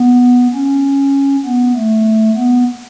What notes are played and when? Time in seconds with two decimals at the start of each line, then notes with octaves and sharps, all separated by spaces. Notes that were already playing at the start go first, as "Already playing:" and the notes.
Already playing: B3
0.54 C#4
1.45 B3
1.76 A3
2.36 B3